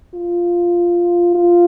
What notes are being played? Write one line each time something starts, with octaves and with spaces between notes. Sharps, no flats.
F4
F4